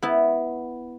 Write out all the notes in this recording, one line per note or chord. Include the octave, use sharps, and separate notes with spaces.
B3 E4